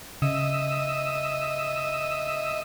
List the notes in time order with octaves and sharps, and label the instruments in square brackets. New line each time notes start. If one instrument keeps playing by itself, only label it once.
[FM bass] C#3 [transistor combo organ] D#5 E5